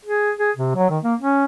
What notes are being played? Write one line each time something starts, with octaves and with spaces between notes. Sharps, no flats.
G#4
G#4
C3
F#3
D#3
A#3
C#4